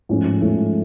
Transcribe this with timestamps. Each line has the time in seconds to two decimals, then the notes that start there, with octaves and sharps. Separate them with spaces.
0.09 G#2 F3 A3 C#4
0.42 G#2 F3 A3 C#4